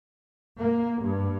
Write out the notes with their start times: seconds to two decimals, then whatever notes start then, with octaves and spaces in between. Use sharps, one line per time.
0.59 A#3
1.02 G2